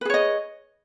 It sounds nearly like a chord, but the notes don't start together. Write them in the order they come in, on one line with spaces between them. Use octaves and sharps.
B4 G#4 C#5 D#5